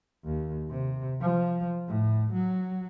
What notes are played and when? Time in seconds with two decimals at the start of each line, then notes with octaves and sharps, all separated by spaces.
0.25 D#2
0.70 C3
1.21 F3
1.88 A2
2.33 F#3